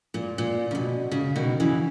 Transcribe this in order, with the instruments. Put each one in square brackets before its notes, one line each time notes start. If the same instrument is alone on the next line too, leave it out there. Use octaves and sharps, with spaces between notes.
[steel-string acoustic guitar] A#2
A#2
C#3
B2
C#3
B2 D#3
C#3 E3